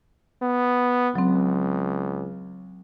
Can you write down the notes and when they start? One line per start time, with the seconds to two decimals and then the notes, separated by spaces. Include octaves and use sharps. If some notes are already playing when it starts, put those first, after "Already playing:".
0.42 B3
1.15 C#2 F#3 C4